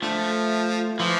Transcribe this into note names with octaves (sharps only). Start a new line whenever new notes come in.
D3 F3 A3
E3 F3